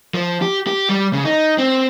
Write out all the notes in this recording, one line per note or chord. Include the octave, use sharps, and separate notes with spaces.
F3
G4
G4
G3
C#3
D#4
C4